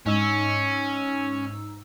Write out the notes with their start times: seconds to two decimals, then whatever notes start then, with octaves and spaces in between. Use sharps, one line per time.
0.06 G#2 C#4 D#4 E6